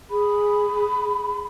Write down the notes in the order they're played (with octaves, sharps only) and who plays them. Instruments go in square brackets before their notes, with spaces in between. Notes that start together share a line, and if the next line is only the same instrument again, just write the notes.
[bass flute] G#4 [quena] B5